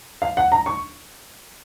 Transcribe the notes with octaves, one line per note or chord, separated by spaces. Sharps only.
F5
F#5
A#5
C#6